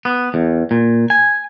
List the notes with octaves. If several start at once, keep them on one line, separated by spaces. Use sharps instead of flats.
B3
E2
A#2
G#5